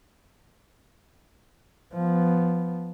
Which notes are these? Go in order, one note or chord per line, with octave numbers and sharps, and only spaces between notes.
F3 B3